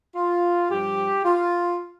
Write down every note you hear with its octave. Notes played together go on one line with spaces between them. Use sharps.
F4
G2 F3 G4
F4